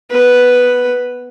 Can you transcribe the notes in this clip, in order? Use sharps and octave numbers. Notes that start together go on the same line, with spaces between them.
B3 B4